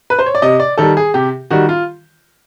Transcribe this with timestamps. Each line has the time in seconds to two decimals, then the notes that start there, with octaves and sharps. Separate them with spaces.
0.10 B4
0.19 C5
0.26 C#5
0.35 D5
0.42 C3 D#5
0.60 D5
0.78 D#3 G3 A4
0.97 G#4
1.14 C3 G4
1.51 D#3 G3 F#4
1.69 F4